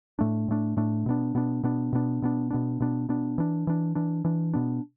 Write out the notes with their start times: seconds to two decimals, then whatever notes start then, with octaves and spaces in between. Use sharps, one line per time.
0.19 A2 A3 D4
0.48 A2 A3 D4
0.77 A2 A3 D4
1.06 B2 B3 D4
1.35 B2 B3 D4
1.63 B2 B3 D4
1.93 B2 B3 D4
2.22 B2 B3 D4
2.51 B2 B3 D4
2.80 B2 B3 D4
3.09 B2 B3 D4
3.38 E3 D4
3.67 E3 D4
3.95 E3 D4
4.25 E3 D4
4.54 B2 B3 D4